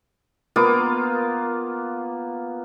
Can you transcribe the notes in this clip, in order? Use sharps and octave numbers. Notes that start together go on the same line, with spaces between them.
A#3 B3 F4 D6